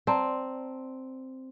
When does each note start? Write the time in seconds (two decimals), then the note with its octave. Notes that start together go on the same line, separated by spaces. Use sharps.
0.07 C4 D5 A5 A#5